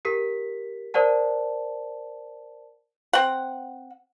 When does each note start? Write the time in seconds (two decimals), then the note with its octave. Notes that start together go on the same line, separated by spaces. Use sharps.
0.05 G4 A#4 B6
0.94 A#4 C5 D5 F#5 A5
3.13 C4 F#5